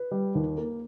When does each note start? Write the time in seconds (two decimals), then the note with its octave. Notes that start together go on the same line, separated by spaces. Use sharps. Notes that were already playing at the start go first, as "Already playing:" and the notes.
Already playing: B4
0.11 G3
0.35 D#2
0.58 A#3